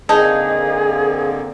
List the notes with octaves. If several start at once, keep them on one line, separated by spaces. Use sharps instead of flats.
D3 A#3 C4 D#4 G#4 A5